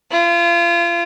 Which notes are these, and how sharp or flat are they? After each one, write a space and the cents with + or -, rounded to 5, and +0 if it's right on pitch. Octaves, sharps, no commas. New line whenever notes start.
F4 -30